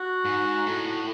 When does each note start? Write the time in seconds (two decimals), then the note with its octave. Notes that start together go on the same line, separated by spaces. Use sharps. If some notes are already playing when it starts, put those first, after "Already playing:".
Already playing: F#4
0.25 G#2
0.66 A2